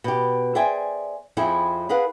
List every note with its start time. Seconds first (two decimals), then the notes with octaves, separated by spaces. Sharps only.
0.04 B2 G4
0.55 G#4 C5 D5 E5 G5 G#5
1.37 F2 F3 C4 E4 G#4
1.89 G#4 A#4 B4 F5 F#5